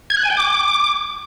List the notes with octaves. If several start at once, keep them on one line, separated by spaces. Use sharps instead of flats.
G#6
F#6
G#5
G5
D6